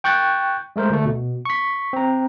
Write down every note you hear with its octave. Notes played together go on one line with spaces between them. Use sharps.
G5 C#6 F#6 G6 A6
G#3 A3 A#4 C5
D2 A3
B2
C#6 B6
C4 A#5